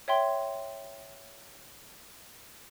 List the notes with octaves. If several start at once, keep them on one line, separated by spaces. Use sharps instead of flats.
C#5 E5 G5 C6